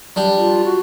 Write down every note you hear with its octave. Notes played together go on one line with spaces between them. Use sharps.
G3 D4 G4
F4
F#4